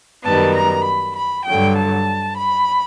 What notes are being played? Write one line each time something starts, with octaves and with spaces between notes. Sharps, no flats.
F#2 D#3 G3 B3 A5
A#5
B5
B5
G2 D3 F#3 G5
A5
B5